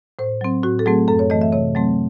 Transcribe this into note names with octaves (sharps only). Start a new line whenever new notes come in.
A2 C5
F#3 C4
A2 F#4
A4
F#3 A3 C4 G#4
F#2 A4
C#5
E3 A3 D#5
E5
C3 C#5
F#3 A3 C4